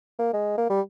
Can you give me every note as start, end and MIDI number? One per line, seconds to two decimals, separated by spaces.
0.19 0.29 58
0.33 0.54 56
0.58 0.68 58
0.70 0.81 55